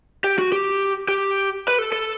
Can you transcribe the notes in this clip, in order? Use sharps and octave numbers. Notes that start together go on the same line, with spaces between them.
G4
F#4
G4
G4
B4
A4
A4